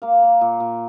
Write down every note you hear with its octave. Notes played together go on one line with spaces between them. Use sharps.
A#3 F5
A#3
A#2
A#2